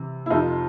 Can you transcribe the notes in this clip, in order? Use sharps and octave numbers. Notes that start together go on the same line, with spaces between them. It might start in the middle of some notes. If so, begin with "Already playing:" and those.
Already playing: C3 E3
E4
F2 C3 F3 D#4 F4